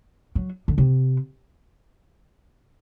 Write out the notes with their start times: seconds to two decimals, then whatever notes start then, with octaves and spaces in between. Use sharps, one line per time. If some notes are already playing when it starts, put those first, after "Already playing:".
0.35 F#3
0.68 D3
0.78 C3